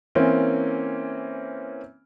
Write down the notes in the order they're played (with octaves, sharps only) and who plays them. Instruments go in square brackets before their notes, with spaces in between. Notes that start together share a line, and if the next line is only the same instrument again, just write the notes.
[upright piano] E3 A#3 C4 C#4